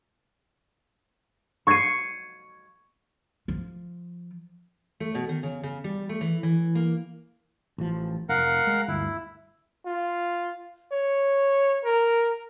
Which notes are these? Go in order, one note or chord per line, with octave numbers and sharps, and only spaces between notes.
C#6 G#6 C7 C#7 D#7
F3
A3
B2
D#3
C#3
C#3
G3
A3
E3
E3
A#3
A1 F3
F1 A#4 F5 F#5
G#3
G1 D2 E4
F4
C#5
A#4